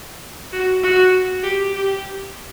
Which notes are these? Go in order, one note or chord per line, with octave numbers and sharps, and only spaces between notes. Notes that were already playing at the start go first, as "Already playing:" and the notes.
F#4
F#4
G4
G4